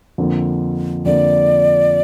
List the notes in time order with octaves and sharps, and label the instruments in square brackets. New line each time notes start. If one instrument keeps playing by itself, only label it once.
[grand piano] F2 D3 F3 A#3
[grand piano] F2 D3 F3 A#3 [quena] D5